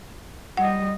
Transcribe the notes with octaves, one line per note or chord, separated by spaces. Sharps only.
G3 D#5 F#5